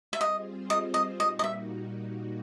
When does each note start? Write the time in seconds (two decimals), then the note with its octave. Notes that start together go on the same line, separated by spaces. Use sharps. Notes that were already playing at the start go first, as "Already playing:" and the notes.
0.13 E5
0.20 G3 C4 F4 G#4 C5 D#5
0.70 D#5
0.94 D#5
1.19 A#2 G3 A#3 D#4 F#4 D#5
1.39 D#5
1.44 E5